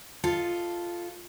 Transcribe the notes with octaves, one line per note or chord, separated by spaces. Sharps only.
F4 A4 D#5